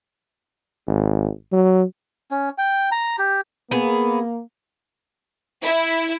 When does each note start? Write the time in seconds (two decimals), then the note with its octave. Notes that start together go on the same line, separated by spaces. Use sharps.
0.87 G#1
1.52 F#3
2.31 C#4
2.58 G5
2.91 A#5
3.19 G4
3.71 A#3 B3 G#4
5.63 E4